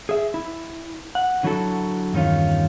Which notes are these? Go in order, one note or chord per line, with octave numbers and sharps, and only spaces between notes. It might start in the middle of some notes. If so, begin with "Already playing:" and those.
G#4 E5
E4
F#5
D3 F#3 E4 F#4 A4
E2 G2 D#3 C#4 F4